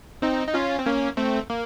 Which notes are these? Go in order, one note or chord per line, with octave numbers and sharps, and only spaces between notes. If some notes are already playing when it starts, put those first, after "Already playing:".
C4 D#4
D#4
C#4 F4
C4
A#3 C#4
A3 C4
A#3